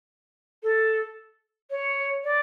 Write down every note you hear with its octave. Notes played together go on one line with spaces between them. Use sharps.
A4
C#5
D5